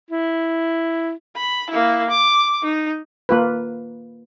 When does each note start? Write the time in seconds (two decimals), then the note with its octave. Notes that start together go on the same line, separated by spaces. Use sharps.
0.11 E4
1.36 B5
1.70 A#3 E4
2.10 D6
2.63 D#4
3.29 A#3 F4 B4